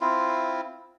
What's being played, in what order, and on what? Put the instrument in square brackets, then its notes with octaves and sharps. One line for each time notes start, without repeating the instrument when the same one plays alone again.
[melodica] C4 E4 F4